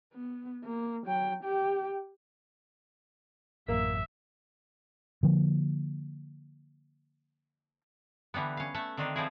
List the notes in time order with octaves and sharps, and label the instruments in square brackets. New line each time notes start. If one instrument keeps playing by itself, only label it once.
[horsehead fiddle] B3
A#3
F#3 G5
G4 G5
[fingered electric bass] A1 F#2 [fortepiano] A#3 [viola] E5
[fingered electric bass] D3 F3 A#3
[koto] D3 E3 G3 B3
C#4 F5
A3 E5 F#5
D3 D#3 C4 D4 D#4
F3 G3 C4 E4 G#4